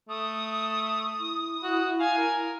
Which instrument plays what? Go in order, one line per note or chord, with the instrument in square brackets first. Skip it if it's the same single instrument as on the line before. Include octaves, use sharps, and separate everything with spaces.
[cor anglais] A3 [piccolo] D#6
[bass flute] E4
[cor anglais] F#4
[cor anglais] F5 [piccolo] G#5
[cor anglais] A#4